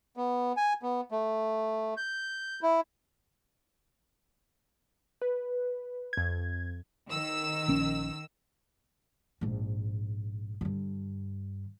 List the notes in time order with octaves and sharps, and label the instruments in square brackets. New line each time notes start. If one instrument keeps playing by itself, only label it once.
[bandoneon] B3
G#5
B3
A3
G6
E4
[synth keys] B4
F2 G#6
[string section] D#3 E6
[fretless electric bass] A#1 C#4
[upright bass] A#1 G#2
G2 D3